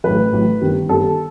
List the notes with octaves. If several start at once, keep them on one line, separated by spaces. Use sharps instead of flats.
A1 A2 F#3 B4
A1 A2 F#3
G1 G2 D#3 G3
G1 G2 D#3 G3 A4